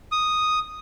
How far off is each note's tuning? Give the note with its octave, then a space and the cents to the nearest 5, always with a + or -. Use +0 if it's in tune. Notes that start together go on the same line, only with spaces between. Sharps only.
D#6 +0